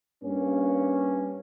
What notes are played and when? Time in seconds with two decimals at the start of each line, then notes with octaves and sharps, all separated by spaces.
0.24 G2 A#3 C#4